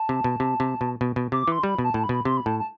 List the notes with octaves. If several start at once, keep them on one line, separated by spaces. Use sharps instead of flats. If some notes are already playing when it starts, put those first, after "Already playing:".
Already playing: A5
C3
B2
C3
C3
B2
B2
B2
C3 D6
E3 C6
G3 B5
B2
A5
A2
B5
B2
C3 C6
B5
A2 A5
A5